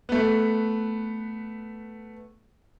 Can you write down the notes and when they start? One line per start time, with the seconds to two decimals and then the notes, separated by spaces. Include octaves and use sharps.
0.09 A3 B3